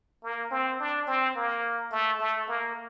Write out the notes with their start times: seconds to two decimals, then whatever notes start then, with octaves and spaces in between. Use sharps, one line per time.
0.24 A#3
0.51 C4
0.80 D4
1.07 C4
1.36 A#3
1.91 A3
2.20 A3
2.48 A#3